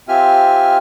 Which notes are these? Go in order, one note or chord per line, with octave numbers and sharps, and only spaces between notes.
C4 F4 G4 E5 G#5 F6